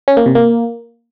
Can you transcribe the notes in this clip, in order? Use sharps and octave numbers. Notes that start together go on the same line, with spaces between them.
C#4
A#3
C3
A#3